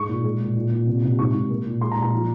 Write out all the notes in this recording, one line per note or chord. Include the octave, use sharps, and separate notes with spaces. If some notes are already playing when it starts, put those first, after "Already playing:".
Already playing: G#2 G#3 C#6
A#2
G#3
A#2
A#2
A#2
C3
C3
G#2 C#6
G#2
A#3
A#2
G#3 C6
A#5
A#2
A#5
F3